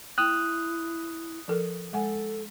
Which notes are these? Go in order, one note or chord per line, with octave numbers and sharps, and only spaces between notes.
E4 G5 D#6 F#6
F3 A4 A#4
G#3 A4 F#5 G#5